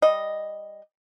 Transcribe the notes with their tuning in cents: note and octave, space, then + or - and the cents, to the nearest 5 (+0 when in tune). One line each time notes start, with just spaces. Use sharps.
G3 +10 D#5 +0